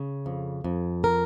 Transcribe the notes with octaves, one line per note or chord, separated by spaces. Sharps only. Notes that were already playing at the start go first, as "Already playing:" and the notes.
Already playing: C#3
F2
F2
A#4